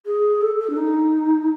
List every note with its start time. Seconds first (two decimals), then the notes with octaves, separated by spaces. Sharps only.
0.05 G#4
0.41 A4
0.60 A4
0.69 D4
0.77 D#4